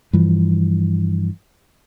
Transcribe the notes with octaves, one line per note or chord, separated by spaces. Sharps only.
G2 E3 F3